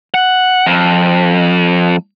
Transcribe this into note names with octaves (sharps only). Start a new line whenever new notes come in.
F#5
F2